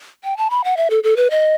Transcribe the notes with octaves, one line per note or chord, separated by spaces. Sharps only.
G5
A5
B5
F#5
E5
A4
A4
B4
D#5